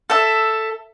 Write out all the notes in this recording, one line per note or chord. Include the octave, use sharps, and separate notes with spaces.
A4 E5